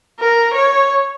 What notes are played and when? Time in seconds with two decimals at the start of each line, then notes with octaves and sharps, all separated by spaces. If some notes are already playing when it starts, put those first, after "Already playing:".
0.20 A#4
0.54 C#5